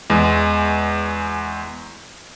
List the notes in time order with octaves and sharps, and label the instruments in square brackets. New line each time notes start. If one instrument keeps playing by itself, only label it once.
[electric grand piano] E2 G#3